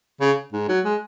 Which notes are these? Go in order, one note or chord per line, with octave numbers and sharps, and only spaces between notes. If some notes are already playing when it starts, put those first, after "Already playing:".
C#3
G#2
F#3
G#3